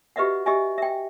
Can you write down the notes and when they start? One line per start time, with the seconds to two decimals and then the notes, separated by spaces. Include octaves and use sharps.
0.16 F#4 G4 B4 D#5 E5 F#5
0.46 G4 D#5 E5 G#5
0.78 E5 G5